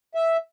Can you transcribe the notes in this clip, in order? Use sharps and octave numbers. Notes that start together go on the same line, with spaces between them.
E5